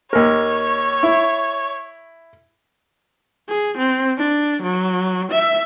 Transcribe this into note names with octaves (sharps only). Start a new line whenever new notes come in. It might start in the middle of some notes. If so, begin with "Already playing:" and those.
D#2 A#4 C#5
E4
G#4
C4
D4
F#3
E5